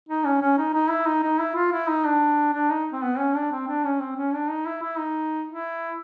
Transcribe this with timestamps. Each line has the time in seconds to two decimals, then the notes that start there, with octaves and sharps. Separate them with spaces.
0.09 D#4
0.25 C#4
0.42 C#4
0.58 D#4
0.74 D#4
0.90 E4
1.06 D#4
1.23 D#4
1.40 E4
1.56 F4
1.72 E4
1.88 D#4
2.05 D4
2.54 D4
2.70 D#4
2.93 C4
3.03 B3
3.19 C#4
3.35 D4
3.51 C4
3.68 D4
3.85 C#4
4.01 C4
4.17 C#4
4.34 D4
4.50 D#4
4.66 E4
4.82 E4
4.98 D#4
5.48 E4